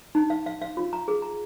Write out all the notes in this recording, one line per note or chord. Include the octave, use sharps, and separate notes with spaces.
D#4
F5
F5
F5
F4
A#5
G#4
A#5